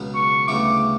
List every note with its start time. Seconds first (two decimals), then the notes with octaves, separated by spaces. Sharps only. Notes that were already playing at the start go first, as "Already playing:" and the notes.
Already playing: C#2 B2 F#3 B3
0.15 C#6
0.48 D2 C#3 G3 B3 E4 D6